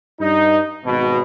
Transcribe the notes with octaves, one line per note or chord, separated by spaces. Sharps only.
G2 D#4
G#1 B2